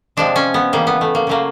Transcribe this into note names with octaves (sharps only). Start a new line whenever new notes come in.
C3 F3 G#3 D4
C#4
B3
C#3 E3 G3 A#3
B3
A3
A#3
C#3 F#3 A3 A#3